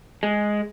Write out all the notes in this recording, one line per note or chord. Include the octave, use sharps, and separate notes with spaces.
G#3